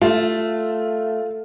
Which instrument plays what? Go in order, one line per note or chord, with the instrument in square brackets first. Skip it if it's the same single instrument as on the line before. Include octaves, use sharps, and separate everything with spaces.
[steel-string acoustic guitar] A3 [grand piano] F4